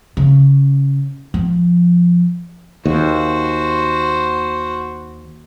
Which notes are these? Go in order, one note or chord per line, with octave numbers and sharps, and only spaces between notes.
C#3
F3
D#2 F#4 C5